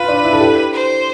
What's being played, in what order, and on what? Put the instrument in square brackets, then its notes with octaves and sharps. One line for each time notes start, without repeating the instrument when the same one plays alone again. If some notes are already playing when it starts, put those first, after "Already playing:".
Already playing: [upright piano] F4 [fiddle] B4
[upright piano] D4
E4
A4
G4
[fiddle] C5